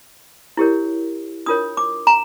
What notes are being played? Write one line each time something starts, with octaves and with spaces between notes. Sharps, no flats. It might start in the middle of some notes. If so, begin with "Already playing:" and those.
E4 G4 A#4 C#5
D4 F4 A#4 C#5 D#6
D6
A#5